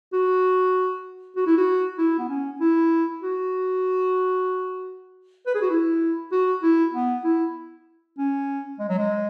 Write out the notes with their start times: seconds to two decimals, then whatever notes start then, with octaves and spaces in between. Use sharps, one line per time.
0.13 F#4
1.36 F#4
1.47 E4
1.57 F#4
1.98 E4
2.18 B3
2.29 C#4
2.60 E4
3.22 F#4
5.46 B4
5.55 G#4
5.61 F#4
5.70 E4
6.32 F#4
6.63 E4
6.93 B3
7.24 E4
8.18 C#4
8.79 G#3
8.89 F#3
8.98 G#3